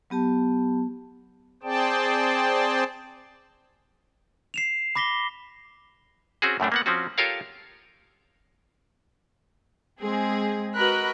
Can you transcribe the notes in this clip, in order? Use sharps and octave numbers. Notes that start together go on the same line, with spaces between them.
F#3 B3 G4 A5
C4 G#4 C5 D5 G5 A5
C7 E7 F7
B5 D6 A#6 B6 G7
C4 C#4 F#4 G#4
F#2 A2 A3 D4
A#3 B3 F#5
F3 C4 C#4 F#4
F4 G4 A4 A#4 C#5 F5
G#3 C4 G#4
F#4 A#4 B4 D#5 B5 F#6